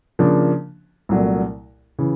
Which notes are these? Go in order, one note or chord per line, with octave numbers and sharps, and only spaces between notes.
C#3 F3 A#3 D4
C2 A#2 F#3 A3
C#3 E3